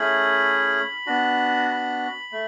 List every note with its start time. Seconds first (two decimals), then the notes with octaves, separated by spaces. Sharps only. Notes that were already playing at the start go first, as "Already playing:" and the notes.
Already playing: A3 C#4 E4 G#4 B5
1.06 B3 D4 F#4
1.69 B5
2.32 A3